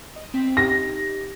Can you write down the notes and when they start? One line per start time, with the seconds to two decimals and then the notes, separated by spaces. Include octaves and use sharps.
0.16 D#5
0.34 C4 G5 B6
0.57 D#4 G4 A#6